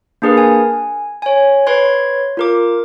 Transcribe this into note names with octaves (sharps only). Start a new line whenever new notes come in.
A#3 D4 G#4 A#4 B4
G#5
C#5 G#5
B4 C#5 C6 G#6
F4 A#4 D6